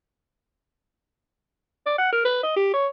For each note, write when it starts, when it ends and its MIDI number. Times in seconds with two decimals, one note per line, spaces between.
1.86 1.96 74
1.98 2.10 78
2.13 2.23 70
2.25 2.39 71
2.43 2.56 75
2.56 2.70 67
2.74 2.87 73